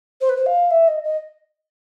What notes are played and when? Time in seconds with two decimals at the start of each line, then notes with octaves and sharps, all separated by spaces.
0.21 C5
0.29 B4
0.37 C5
0.46 F5
0.71 E5
0.88 D#5
1.04 D#5